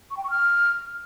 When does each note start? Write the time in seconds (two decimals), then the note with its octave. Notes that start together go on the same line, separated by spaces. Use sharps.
0.11 C#6
0.17 G5
0.24 C#6
0.30 F6